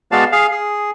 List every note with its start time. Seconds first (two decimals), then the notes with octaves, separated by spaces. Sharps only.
0.12 G#3 B3 F#4 D5 F5 A5
0.32 G#4 F5
0.51 G#4